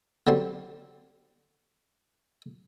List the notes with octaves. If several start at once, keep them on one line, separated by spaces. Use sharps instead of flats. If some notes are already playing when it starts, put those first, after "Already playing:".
D3 F#3 G3 C4 C6